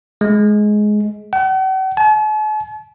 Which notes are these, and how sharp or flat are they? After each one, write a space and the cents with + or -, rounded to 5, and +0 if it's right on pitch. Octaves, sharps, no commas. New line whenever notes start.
G#3 +15
F#5 +45
A5 -45